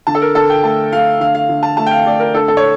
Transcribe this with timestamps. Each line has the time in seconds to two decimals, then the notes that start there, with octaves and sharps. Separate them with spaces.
0.07 D3 A5
0.15 A4
0.22 A#4
0.35 D3 A4
0.50 G5
0.63 A3 A5
0.93 A3 F5
1.20 D3 F5
1.35 F5
1.49 D3
1.63 A5
1.77 A3 A5
1.86 G5
1.91 F5
2.06 A3 D5
2.20 A#4
2.34 D3 A4
2.48 A4
2.57 C#5